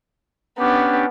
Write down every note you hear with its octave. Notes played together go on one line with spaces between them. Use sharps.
B3 C#4 D4 G4